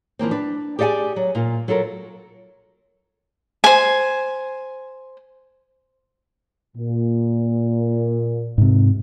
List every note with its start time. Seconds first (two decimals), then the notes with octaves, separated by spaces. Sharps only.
0.19 E3 F3 A#3 C4
0.31 D4 B4
0.79 G4 G#4 D5 F#5 G#5
1.16 F#3
1.35 A#2 F4
1.68 F#3 F4 A4 A#4
3.64 C5 G#5
6.77 A#2
8.58 G#2 C3